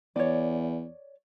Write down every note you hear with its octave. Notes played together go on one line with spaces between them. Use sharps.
E2 C#5 D5